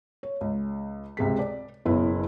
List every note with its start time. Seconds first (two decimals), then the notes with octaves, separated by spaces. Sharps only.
0.23 C#5
0.41 C#2
1.17 C#2 C3 G#3 B6
1.39 D5
1.85 F#1 B2 E4 B4 C#5